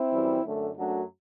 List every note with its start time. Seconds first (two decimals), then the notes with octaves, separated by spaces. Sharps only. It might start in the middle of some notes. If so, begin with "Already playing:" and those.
Already playing: C4 E4
0.10 F#2 E3 G3
0.43 F#2 D3 A3
0.76 F#2 F#3 A3 D4 F#4